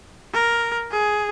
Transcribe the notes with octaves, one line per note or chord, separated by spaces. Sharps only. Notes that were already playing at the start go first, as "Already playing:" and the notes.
A#4
G#4